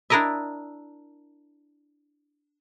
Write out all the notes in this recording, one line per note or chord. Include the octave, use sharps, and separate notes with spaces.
D4 E4 A#4 D#5 E5